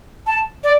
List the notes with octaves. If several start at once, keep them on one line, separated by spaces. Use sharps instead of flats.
A5
D5